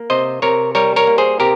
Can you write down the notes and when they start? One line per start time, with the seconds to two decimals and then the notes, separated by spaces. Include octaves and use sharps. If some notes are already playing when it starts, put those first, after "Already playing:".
Already playing: A#3
0.10 C3 C5 D#5
0.42 C3 A#4 C#5
0.75 G3 A#4 C#5
0.96 A#4 C#5
1.07 A#3
1.18 G#4 C5
1.40 C3 G4 A#4